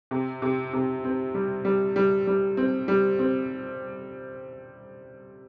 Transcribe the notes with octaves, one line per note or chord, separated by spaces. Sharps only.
C3
C3
C3
C4
G3
G3
G3
G3
C4
G3
C4